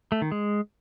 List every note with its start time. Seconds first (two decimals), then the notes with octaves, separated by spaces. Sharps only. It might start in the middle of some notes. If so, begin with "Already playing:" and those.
0.12 A3
0.22 D#3
0.32 G#3